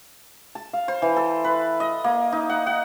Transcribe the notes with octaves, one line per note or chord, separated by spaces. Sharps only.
A5
F5
C5
E3
A4
B4
D#5
A#3
D#4
F#5
F#5